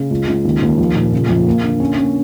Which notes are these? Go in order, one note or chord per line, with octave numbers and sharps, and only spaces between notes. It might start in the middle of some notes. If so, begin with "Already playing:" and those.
Already playing: C#3
C#2
C#2
D#2
D#2
F3
A#2
C#3
F2
A#3
D3
C#4
C#4